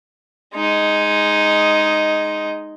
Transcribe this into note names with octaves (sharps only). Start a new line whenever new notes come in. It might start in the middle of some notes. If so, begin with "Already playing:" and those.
G#3 D#4